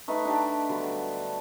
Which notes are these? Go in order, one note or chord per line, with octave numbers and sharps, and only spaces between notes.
A3 D#4 B4
D4 G4 G5
D3 F#3 G3 B3